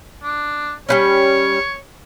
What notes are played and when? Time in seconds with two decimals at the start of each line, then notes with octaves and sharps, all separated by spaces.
0.23 D4
0.89 G3 B3 C#4 C#5